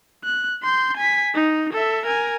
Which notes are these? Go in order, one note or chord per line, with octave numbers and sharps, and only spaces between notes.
F#6
C6 G6
G#5 B6
D#4
A4 E5
A#4 G#5